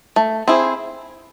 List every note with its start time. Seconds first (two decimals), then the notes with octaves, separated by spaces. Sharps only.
0.16 A3
0.48 C4 E4 G#4